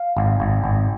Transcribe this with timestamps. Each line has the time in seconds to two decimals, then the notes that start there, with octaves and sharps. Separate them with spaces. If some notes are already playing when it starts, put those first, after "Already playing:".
Already playing: F5
0.17 G#1
0.40 G#1
0.64 G#1